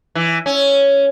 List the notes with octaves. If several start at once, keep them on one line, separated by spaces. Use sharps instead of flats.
E3
C#4